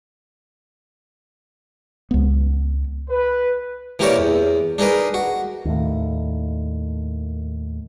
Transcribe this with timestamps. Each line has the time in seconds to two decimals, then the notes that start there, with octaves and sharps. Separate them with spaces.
2.11 C#2 B3
3.09 B4
3.99 E3 A#3 G4 A#4 C#5 D5
4.18 E2
4.78 D4 D#4 G#4 A#4 B4
5.14 F#4
5.65 D#2 A2